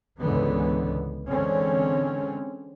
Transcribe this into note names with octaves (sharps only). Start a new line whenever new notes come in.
C#2 G#2 D3 E3 B3
D3 E3 G#3 C4 C#4